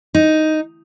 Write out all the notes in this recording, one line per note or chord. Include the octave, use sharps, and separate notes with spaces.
D#4